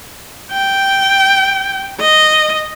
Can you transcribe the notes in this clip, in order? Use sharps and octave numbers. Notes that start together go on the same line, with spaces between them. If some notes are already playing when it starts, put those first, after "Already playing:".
G5
D#5